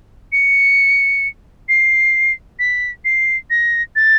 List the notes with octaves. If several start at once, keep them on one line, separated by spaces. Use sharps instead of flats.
C#7
C7
B6
C7
A#6
A6